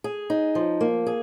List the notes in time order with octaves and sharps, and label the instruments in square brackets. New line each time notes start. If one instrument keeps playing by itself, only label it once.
[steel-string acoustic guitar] G#4
D#4
F3
A#3
G#4